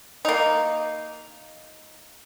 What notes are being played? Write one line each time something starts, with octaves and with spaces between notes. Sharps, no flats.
A#3 D#4